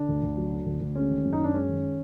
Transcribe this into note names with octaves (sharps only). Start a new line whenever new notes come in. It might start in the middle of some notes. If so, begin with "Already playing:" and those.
Already playing: D3 D4
D2
D2
F#3
D3
D2
D2
G#3 C#4
D#3
F#2
D#4
F#2 D4
G#3 C#4
D#3